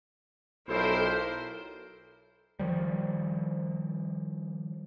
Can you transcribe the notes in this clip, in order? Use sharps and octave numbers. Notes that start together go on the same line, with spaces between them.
B1 E4 F4 A4 A#4 C5 D#6
D#3 F3 G3